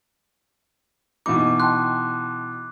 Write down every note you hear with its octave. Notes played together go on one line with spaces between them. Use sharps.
B2 E3 D#4 D6
G5 A5 C6 F#6